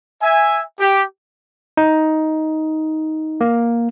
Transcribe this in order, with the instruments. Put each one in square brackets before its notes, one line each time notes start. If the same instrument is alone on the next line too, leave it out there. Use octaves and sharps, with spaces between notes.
[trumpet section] E5 G#5
G4
[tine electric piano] D#4
A#3